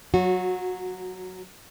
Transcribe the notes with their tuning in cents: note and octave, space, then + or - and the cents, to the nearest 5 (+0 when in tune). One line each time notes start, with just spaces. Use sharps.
F#3 +0 F#4 -25